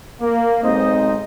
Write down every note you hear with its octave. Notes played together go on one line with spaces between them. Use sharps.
A#3
B1 G#3 C4 D#4 C5 D#5